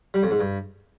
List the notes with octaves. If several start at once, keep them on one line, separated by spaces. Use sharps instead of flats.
G3
F2
G#2
G2